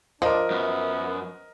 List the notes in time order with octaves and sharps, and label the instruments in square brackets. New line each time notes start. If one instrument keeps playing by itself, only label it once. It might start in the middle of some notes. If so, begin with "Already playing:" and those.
[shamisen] F3 [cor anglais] D4 [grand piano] A#4 D#5
[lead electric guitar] F#2 [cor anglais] B3